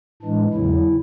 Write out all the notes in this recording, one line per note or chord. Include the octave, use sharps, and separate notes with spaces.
A2 E3 G#3 D4
E2 C#3 F#3 E4